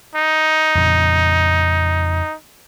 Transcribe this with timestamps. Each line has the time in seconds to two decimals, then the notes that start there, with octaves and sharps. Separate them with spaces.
0.15 D#4
0.75 F2 A#2 C#3